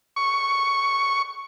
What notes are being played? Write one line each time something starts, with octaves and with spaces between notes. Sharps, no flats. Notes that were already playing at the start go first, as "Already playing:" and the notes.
C#6